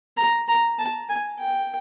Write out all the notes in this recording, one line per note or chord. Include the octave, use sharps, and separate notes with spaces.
A#5
A#5
A5
G#5
G5